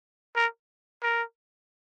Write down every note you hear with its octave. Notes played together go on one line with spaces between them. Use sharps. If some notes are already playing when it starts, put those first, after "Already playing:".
A#4
A#4